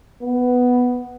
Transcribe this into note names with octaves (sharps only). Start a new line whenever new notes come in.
B3